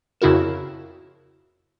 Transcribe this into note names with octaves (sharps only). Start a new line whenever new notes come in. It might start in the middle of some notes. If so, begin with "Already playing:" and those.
F2 C#3 E4 F#4 A#4 E7